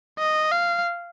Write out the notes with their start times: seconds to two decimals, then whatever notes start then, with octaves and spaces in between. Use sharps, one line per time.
0.19 D#5
0.51 F5